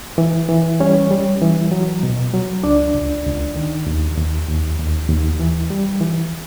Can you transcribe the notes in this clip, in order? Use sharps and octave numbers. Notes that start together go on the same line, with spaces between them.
E3
E3
G3 C#4 C#5
G3
E3
F#3
B2
F#3
C#2 D4 D5
C#2
C#2
D#3
D#2
D#2
D#2
D#2
D#2
E3
G3
E3